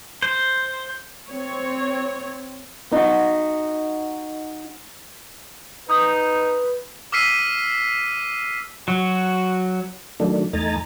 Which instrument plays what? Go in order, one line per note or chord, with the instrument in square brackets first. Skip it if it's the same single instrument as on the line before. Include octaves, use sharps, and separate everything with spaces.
[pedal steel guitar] C5
[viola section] C4 C#5
[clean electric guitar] D#4 F#4
[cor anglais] D#4 [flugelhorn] B4 [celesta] D#6 G6
[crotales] D6 E6 F6 B6 C7 D#7
[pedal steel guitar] F#3 [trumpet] F#4
[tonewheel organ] D#3 F#3 A3 D4
E2 A3 D#4 G#5 A#5 A6